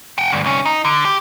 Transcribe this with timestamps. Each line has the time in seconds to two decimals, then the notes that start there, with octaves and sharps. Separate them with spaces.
0.18 F#5 G5
0.32 D2 G2
0.44 C2 C#4
0.65 D#4
0.85 D3
1.05 G4